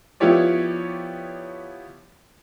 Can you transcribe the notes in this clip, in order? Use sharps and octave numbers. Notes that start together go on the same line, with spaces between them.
F3 B3 E4 G4 C#5 D5